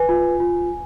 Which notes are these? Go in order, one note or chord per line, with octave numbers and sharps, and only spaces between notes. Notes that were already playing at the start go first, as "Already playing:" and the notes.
Already playing: B4 G#5
F4
F4